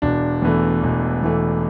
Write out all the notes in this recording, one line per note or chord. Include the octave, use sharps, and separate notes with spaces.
E1 D4
E2 E3 A3
E1
E2 E3 A3